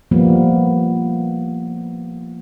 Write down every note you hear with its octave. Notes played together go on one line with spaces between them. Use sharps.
F3 G3 A#3 B3